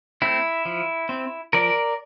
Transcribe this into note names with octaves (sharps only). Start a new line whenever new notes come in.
A3 C4 E4
F3
C4
F3 A#4 D5